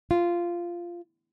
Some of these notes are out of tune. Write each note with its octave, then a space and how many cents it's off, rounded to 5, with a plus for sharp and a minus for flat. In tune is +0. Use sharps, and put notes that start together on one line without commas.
F4 -10